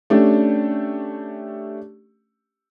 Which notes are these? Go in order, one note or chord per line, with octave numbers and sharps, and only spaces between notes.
A3 C#4 D4 G4